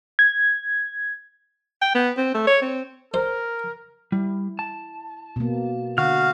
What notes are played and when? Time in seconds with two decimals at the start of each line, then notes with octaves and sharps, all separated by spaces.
0.19 G#6
1.81 G5
1.95 B3
2.17 C4
2.34 A3
2.47 C#5
2.62 C4
3.14 A#4 C5
4.12 G3 E4
4.59 A5
5.36 B2 A#3
5.98 D3 F#4 F5 F6